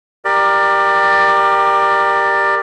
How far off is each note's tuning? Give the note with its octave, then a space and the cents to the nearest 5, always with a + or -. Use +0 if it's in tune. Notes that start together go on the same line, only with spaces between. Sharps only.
G4 +0 A#4 +0 D5 +20